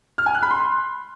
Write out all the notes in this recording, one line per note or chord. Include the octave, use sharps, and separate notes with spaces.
F6
G#5
F#6
B5
C6